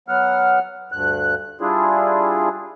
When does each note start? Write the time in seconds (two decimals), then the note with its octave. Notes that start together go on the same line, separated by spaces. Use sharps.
0.08 F#3 B3 F#5 F6
0.92 D2 G2 F#6
1.61 G3 D4 E4 F4 G#4